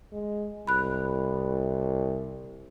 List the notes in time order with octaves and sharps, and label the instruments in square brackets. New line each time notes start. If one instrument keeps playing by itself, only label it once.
[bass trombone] G#3
[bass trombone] C2 [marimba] B5 F#6